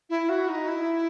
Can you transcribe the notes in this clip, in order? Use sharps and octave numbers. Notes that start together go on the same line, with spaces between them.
E4
F#4
D#4
E4